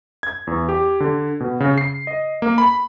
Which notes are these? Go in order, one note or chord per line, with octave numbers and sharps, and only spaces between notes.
G#6
E2
G4
D3
B2
C#3
C7
D#5
A#3
B5